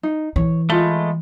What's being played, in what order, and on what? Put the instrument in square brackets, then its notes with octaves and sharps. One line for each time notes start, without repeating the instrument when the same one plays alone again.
[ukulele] D#4
[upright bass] E3 [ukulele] C#5
[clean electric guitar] G#3 A3 [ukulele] F4 B5